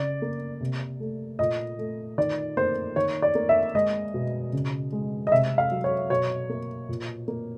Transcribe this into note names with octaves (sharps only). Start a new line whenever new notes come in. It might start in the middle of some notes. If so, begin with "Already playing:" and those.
Already playing: C#3 D5
A#3
C3
A3
A#2 D#5
A3
D#3 D5
A#3 C5
D#3 C#5
D5
A#3
E5
G#3 D#5
B2
C#3
G#3
D#5
C3 E5
F5
F#3
C#5
B2 C#5
A#3
A#2
A#3